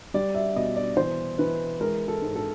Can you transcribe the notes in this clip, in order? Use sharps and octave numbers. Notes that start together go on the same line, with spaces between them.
G3 D5
E5
B2 D#5
D5
E3 C5
E3 B4
G#3 A#4
A4
G#2
A4